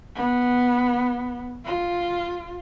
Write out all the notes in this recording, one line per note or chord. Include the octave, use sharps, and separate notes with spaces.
B3
F4